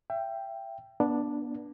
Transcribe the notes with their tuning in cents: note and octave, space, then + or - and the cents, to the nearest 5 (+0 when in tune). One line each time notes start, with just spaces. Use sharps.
E5 +30 G5 +0
B3 -30 D4 +0